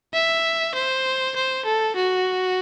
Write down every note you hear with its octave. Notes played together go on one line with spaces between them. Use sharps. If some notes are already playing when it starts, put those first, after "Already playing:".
E5
C5
C5
A4
F#4